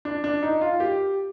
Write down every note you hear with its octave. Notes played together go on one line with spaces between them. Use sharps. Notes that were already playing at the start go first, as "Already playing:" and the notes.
D4
D4
D#4
F4
G4